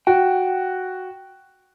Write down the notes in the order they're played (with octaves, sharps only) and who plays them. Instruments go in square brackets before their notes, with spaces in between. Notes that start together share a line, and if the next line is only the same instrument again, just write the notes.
[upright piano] F#4 [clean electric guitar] G5